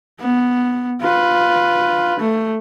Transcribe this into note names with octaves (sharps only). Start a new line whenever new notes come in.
B3
F4 B4
A3